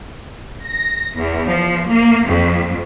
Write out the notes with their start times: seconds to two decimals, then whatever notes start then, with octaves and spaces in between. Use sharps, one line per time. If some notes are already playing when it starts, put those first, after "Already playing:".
0.64 A#6
1.17 E2
1.49 F3
1.90 A#3
2.28 F2